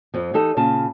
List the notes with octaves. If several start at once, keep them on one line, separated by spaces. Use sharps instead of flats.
F2 F3
E3 D#4 G4 A4 D#5
A#2 C#3 F4 A5